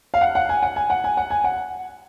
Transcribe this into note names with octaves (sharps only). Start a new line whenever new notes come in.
F5
F#5
F#5
G#5
F#5
G#5
F#5
G#5
F#5
G#5
F#5